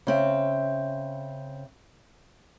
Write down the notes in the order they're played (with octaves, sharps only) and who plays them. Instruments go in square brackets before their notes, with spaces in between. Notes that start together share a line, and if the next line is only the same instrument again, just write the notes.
[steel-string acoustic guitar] C#3 C4 E5